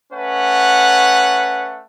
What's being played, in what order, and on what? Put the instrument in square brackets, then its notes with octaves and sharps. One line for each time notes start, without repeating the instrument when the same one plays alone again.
[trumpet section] A3 C#4 B4 F#5